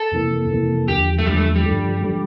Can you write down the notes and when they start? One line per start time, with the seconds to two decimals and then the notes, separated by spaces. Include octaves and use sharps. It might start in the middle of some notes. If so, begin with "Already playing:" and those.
Already playing: A4
0.12 F2 C3 E3 A#3
0.50 F2 C3 E3 A#3
0.88 E2 D3 F3 G4
1.19 A3
1.26 E2 D3 F3 G3
1.37 A3
1.56 G3
1.66 G2 D3 F3 A3
2.04 D3 F3 A3